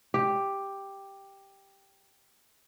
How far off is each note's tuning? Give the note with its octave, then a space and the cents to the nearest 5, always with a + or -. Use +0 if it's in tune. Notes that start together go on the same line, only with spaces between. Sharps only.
G4 +5